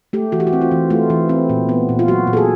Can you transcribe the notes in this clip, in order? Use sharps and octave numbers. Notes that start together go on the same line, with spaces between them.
A3 G4
E3 F#4
G4
F#4
C4
F4
E3
A3 F4
E3
C4
A#2
B3
A#2
F4
F#3 F#4
A#2
A4
G#4